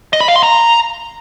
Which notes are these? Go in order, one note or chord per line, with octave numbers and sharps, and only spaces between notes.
D#5
B5
F5
C6
A#5